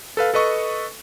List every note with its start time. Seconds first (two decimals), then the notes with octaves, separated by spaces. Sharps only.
0.17 A4 B4 F5
0.34 A4 B4 D#5 C#6